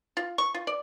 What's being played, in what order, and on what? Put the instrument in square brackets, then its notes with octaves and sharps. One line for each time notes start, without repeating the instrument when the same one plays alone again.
[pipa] F4
C#6
F4
D5